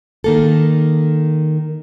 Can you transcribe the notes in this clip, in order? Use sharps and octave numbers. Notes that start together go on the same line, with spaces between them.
D#3 A#3 A4